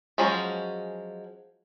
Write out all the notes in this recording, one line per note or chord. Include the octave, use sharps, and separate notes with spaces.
F3 F#3 G#3 C#4